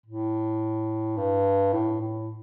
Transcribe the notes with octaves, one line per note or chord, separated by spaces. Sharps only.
A2
G2
A2
A2